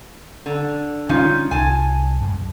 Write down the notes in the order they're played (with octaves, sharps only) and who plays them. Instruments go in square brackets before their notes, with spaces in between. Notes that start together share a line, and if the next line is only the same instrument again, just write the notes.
[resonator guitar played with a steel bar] D3
[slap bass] D3 G3 G#3 [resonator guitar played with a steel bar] C#4 D#4 F4
[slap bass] C2 [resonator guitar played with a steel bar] G#5 A5
[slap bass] F#2 G#3